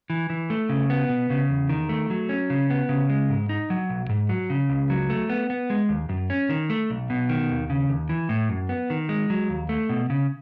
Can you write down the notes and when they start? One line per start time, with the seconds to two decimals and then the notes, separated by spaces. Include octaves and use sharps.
0.10 E3
0.30 E3
0.50 A3
0.69 C#3
0.90 B3
1.09 B2
1.30 C#3
1.50 E2
1.69 D#3
1.89 A3
2.10 F#3
2.29 C#4
2.50 C#3
2.70 B3
2.89 C#3
3.10 G#3
3.30 G#2
3.49 D#4
3.70 F#3
3.89 B1
4.09 G#2
4.29 F#3
4.50 C#3
4.69 C#2
4.90 F#3
5.10 A3
5.30 B3
5.50 B3
5.70 G#3
5.89 D#2
6.09 F#2
6.30 C#4
6.50 D#3
6.70 A3
6.90 B1
7.10 B2
7.29 D#3
7.50 D#2
7.70 C#3
7.89 D#2
8.09 E3
8.29 A2
8.49 F#2
8.69 B3
8.90 D#3
9.09 G#3
9.30 F#3
9.49 D#2
9.69 A3
9.89 B2
10.10 C#3